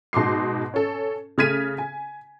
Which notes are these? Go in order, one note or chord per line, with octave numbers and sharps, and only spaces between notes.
G#2 B2 C6 D6 C7
C#4 A4
C#3 A3 F6 G#6 B6 D#7
G#5